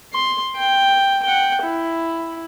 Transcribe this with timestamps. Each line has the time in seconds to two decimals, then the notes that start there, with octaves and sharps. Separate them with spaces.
0.13 C6
0.56 G5
1.23 F#5 G5
1.61 E4